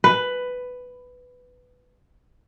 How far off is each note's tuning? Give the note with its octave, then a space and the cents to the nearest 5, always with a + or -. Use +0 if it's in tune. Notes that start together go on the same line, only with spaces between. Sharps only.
B4 +10